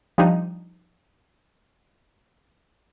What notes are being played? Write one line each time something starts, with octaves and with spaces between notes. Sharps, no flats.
F3 G3 D4 D#4